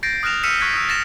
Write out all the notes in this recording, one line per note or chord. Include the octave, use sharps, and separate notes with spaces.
G6 A6 A#6 C7 D7
D#6 F6 F#6 A#6 E7 F7
E6 F6 B6 C#7 D#7 E7
C#6 F#6 G#6 B6
D#6 E6
A6 A#6 E7